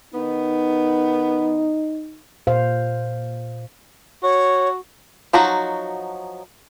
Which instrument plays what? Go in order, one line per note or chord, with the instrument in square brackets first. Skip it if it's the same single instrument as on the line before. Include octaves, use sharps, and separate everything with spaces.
[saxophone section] D#3 B3 [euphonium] D#4
[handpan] A#2 C5 F5
[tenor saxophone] F#4 [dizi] C#5
[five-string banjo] F3 F#3 D#4 F#4